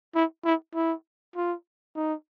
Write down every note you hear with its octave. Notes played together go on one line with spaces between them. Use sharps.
E4
E4
E4
F4
D#4